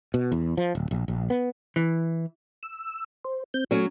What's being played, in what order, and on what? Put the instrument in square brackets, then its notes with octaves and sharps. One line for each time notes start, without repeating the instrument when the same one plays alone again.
[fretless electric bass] B2
E2
F3
D1
A#1
A#1
B3
[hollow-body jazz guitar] E3
[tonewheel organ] E6
C5
C4 G6
[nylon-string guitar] F#3 C#4 [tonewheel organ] A3